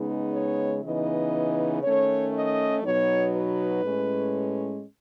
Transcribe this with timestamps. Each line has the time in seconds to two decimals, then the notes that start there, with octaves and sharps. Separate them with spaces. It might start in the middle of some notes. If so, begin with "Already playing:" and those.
Already playing: C#3 G#3 B3 D#4
0.33 C#5
0.82 C#3 E3 B3 D#4 D#5
1.83 D#3 A3 C#4 C#5
2.33 D#5
2.83 B2 F#3 B3 D#4 C#5
3.34 B4
3.83 A2 G#3 C#4